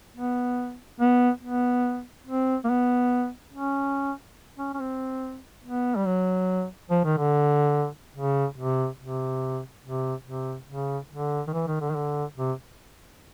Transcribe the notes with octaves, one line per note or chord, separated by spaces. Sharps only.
B3
B3
B3
C4
A#3
B3
C#4
C#4
C#4
C4
B3
G3
F#3
F3
D#3
D3
C#3
C3
C3
C3
C3
C#3
D3
D#3
E3
D#3
D3
D#3
D3
C3